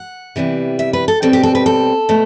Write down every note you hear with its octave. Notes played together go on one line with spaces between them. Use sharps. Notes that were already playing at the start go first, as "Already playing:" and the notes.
Already playing: F#5
C3 E3 G3 B3
E5
B4
A4
B2 G3 C4 A4
G4
A4
B4
A4
B2 A3